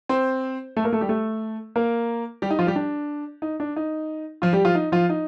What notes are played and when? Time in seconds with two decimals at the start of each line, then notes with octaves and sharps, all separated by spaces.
0.09 C4 C5
0.77 A3 A4
0.84 A#3 A#4
0.93 A3 A4
1.01 G3 G4
1.09 A3 A4
1.76 A#3 A#4
2.42 G3 G4
2.50 D#4
2.59 F3 F4
2.67 G3 G4
2.76 D4
3.42 D#4
3.60 D4
3.76 D#4
4.42 F3 F4
4.53 G3 G4
4.65 F3 F4
4.75 D#4
4.92 F3 F4
5.09 D#4